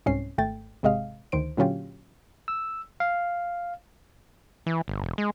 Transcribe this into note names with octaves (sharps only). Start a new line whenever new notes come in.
C2 G#2 C3 C#4 C7
G#1 A3 G5 A6
G#1 C3 G#3 D#5 F5
D2 D#3 C5 D7
A#2 D3 F#3 C#4 F4 G4
E6
F5
E3
G1
E1
G#3